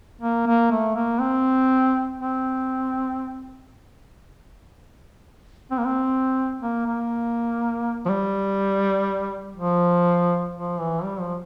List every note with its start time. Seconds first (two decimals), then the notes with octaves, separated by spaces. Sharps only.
0.22 A#3
0.47 A#3
0.72 A3
0.96 A#3
1.20 C4
2.19 C4
5.71 C4
5.78 A#3
5.85 C4
6.62 A#3
6.86 A#3
8.05 F3
8.09 G3
9.57 F3
10.55 F3
10.80 E3
11.04 G3
11.21 F3